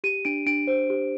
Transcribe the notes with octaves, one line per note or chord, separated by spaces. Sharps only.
G4 D#7
D4 D7
D4 D7
C5
G4